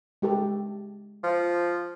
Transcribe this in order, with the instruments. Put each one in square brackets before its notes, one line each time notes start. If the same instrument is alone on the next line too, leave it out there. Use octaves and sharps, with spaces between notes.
[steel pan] G#3 G4 A4
[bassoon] F3